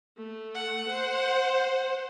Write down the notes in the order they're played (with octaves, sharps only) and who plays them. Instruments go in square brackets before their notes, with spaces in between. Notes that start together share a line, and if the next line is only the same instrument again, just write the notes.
[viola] A3
[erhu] F#5
[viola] C5